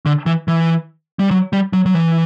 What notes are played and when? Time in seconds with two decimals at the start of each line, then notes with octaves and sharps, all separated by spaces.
0.06 D3
0.26 E3
0.48 E3
1.19 G3
1.31 F#3
1.53 G3
1.73 F#3
1.86 F#3
1.94 E3